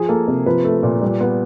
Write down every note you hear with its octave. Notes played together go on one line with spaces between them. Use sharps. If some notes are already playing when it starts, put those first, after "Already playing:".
Already playing: F3 G#4
A#3 A4
C3 A#4
F3 B4
A3
A#2
G3
B3